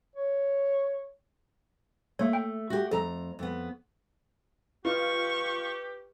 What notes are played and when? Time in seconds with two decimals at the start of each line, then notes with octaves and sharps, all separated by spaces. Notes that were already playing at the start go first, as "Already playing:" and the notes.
0.16 C#5
2.19 A3 A#3 C#5
2.33 G5
2.70 F#4 G4
2.91 F2 A4 A#5
3.39 F2 B3
4.85 F4 G4 B4 D#5 C#6 F6